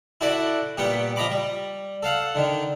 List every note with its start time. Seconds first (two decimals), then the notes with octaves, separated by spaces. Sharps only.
0.21 E4 F#4 A4 D5 F#5
0.78 A#2 G3 B3 G4
1.16 F3 D#5 A#5 B5 D6
1.30 G3
2.03 A4 F5 F#5
2.35 D3 D#3